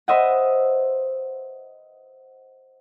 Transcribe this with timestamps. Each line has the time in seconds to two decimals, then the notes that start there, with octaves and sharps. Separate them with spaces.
0.08 B4 C5 D#5 E5 F#5